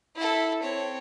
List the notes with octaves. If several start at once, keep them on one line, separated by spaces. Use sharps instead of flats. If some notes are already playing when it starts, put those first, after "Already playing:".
E4 A4
C4 C#5